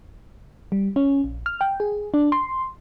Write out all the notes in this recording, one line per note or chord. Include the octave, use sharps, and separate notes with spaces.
G3
C#4
A#1
F6
G5
G#4
D4
C6